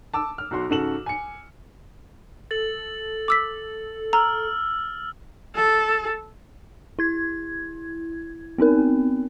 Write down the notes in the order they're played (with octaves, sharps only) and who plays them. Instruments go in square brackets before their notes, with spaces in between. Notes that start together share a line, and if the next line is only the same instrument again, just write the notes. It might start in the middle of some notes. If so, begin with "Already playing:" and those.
[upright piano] A5 D6 E6
F6
B1 F#4 C6
G#2 C#3 F#4 A4 E7 F#7
G#5 C#7
[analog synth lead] A4 [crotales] A6 F#7
[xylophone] D6 E6 B6
[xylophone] A#5 [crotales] E6 F6
[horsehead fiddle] A4
[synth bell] E4 G#6
B3 C4 D#4 A#4